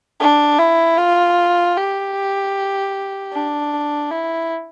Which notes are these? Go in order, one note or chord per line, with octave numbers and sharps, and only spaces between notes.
D4
E4
F4
G4
D4
E4